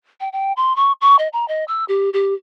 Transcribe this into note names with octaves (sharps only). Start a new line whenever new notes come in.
G5
G5
C6
C#6
C#6
D#5
A#5
D#5
E6
G4
G4